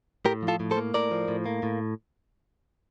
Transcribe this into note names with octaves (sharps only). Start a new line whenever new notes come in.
A2 G4 A#4
F3
F4 A4
A2
A4 C5
A#3
A2 A#4 D5
F3
A2
A#3
A2